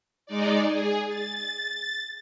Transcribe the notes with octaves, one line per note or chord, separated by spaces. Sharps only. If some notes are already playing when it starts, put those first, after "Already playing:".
G#3 D#4 D5
G#4
A6